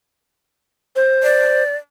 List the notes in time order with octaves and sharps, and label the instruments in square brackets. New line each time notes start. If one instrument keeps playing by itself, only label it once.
[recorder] C5
[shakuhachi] D5